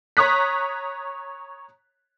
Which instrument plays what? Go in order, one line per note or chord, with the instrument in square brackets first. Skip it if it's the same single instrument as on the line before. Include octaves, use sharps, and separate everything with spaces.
[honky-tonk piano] C#5 A#5 C#6 D#6 F#6 B6